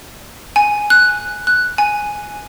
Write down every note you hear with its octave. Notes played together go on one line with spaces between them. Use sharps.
G#5
F#6
F#6
G#5